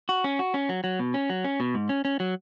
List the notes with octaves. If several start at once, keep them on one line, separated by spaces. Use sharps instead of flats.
F#4
C#4
F#4
C#4
F#3
F#3
B2
C#4
F#3
C#4
B2
G#2
C#4
C#4
F#3